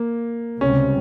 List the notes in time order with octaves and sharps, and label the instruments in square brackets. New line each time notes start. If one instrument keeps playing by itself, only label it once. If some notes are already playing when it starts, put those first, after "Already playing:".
Already playing: [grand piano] A#3
[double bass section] C#2 C3 G3 [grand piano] C#4